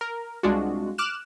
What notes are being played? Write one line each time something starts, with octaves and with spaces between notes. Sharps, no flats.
A#4
C2 G#3 D4 F4 F#4
D6 F6 F#6 E7